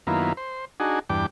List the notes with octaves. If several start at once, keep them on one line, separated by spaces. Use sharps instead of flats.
F#2 D#3 A#3 B3 E4 F4
C5
D4 D#4 F#4 G#4
E2 G2 D4 G5 D6